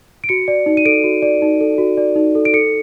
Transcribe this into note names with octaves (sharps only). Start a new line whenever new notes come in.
D7
F#4 C#7
D5
D#4
D#7
A4 D7
F#4
D5
D#4
A4
F#4
D5
D#4
A4
D7
A4 C#7